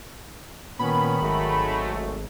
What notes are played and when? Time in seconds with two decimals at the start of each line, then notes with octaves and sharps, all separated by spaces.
0.79 A#2 D#3 B3 C#4 B5
1.22 G#1 F#3 G#3 A3